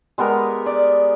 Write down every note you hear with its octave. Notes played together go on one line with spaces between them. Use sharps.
G#3 B3 G4 A#4
D5